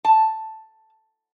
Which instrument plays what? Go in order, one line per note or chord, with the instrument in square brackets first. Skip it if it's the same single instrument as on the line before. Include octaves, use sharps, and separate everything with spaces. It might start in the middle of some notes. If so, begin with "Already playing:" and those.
[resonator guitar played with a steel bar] A5